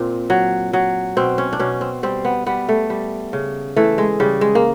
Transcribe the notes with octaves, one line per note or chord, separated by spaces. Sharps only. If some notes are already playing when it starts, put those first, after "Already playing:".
Already playing: A#2 C4
F#3
F#3
B2 C4
C#4
D4
B2 C#4
C4
G3 C4
B3
G3 B3
A3
G3
C#3
E3 A3
G#3
C#3 G3
G#3
A#3